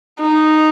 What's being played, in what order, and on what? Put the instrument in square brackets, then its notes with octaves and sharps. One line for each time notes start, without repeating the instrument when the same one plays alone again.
[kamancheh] D#4